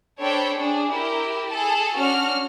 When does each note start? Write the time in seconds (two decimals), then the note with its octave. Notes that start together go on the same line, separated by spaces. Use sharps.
0.21 D4 A4 C5 C#5 G5 B5
0.56 D4 G#4
0.91 E4 G4 A#4 G5
1.49 G#4 A4 A5
1.96 C#4 D4 F#4 F6